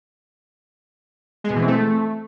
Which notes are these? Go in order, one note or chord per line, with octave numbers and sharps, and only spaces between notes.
G#3
B2
E3
C4
A3